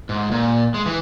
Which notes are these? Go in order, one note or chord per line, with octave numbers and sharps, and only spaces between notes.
G#2
A#2
G#3
E3